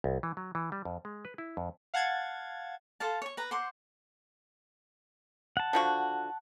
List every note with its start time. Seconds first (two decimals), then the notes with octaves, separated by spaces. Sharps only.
0.04 C2
0.23 E3
0.37 F#3
0.55 E3
0.72 G3
0.85 F2
1.05 G#3
1.25 B4
1.38 E4
1.57 F2
1.94 F5 F#5 A5 G#6 A6
3.00 A4 C5 F5 A5
3.22 C#5 C#6
3.37 B4 A#5
3.51 C5 F#5 C6 D6
5.57 F#5 A5
5.73 D3 F3 F#4